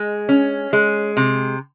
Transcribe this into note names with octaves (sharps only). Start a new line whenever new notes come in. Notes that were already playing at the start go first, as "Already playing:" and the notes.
Already playing: G#3
C#4
G#3
C3